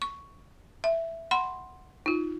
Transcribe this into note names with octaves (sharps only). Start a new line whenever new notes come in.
C#6
E5
F#5 B5 C6
D#4 F4